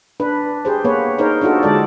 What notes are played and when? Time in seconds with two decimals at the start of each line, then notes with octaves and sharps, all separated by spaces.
0.20 D4 B4
0.65 G4 G#4 C5
0.85 A#3 B3 B4 C#5
1.18 D#4 G#4 A#4 C5 C#5
1.41 D4 D#4 F4 F#4 A4
1.63 D3 G#3 A4 D5